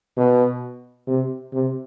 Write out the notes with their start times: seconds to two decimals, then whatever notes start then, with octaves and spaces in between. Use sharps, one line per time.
0.17 B2
1.07 C3
1.53 C3